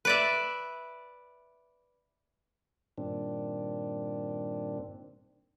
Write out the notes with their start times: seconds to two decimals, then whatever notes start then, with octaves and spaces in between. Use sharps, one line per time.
0.05 B4 D5 E5
2.98 G2 A#2 D#3 C4 D4